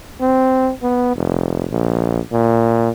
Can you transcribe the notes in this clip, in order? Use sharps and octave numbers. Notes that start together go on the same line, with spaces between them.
C4
B3
F1
A#1
A#2